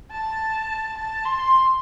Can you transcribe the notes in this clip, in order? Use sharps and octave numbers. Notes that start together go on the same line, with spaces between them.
A5
A5
C6